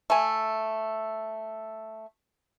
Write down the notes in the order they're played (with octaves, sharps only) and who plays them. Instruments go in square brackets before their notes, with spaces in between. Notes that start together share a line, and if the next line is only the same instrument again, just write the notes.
[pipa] A3 G#5